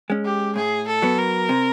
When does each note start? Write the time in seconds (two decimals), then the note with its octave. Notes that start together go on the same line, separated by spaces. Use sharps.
0.10 G#3 C#4
0.25 G4
0.55 A2 G#4
0.87 A4
1.02 F#3 B3
1.18 A#4
1.49 C3